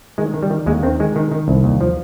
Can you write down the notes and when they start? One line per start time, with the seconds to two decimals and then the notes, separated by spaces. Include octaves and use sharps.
0.18 D#3 G#3
0.34 D#3
0.43 G3
0.50 D#3
0.66 D#2 G#3
0.83 D#3 C4
1.00 D#3 G#3
1.16 D#3
1.31 D#3
1.48 C2
1.64 D#2
1.81 F3